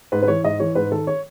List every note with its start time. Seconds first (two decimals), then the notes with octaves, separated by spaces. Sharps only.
0.12 G#2 B4
0.23 B4
0.28 E3 C#5
0.44 G#2 D#5
0.60 E3 C#5
0.75 G#2 B4
0.92 D#3 A4
1.07 C#5